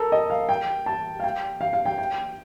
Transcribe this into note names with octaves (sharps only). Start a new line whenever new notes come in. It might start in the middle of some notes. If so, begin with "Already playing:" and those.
Already playing: A4 A#4
D#5
F5
G5
A5
F5
G5
F5
F5
G5
G5